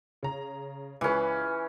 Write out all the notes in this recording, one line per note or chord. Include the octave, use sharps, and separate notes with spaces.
C#3 A#5
C#2 E3 C#4 B4